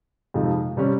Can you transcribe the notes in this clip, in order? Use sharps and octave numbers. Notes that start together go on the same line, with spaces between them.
F2 C3 F3 G#3 D#4
C3 G3 C#4